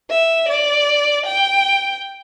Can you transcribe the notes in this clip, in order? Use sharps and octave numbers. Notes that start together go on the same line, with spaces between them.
E5
D5
G5